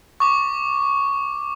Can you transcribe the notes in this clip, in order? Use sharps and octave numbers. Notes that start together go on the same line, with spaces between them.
C#6 D6